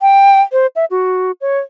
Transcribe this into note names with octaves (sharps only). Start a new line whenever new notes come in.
G5
C5
E5
F#4
C#5